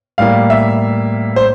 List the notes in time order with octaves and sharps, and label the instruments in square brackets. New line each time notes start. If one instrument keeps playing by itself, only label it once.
[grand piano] A2 G3 A#3 F5
E5
C5